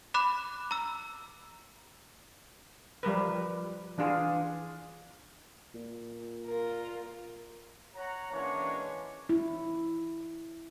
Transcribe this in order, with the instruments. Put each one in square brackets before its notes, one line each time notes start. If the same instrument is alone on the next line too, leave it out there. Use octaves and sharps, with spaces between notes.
[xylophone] B5 D6 F#6 E7
A#5 E6
[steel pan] F3 G3 A#4 B4
E3 D4 F4 G#4
[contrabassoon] A#2
[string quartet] F4 A#4
[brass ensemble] C#5 F#5 A#5
E3 G#3 A#3 C#4 D4 C#5
[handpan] E4